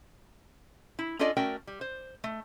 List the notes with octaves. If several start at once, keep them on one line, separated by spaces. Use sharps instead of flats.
E4
C#4 D4 F4 A4 D5 D#5
A3 C#4 F#4 A#4 D5 G5
G3
C5
A3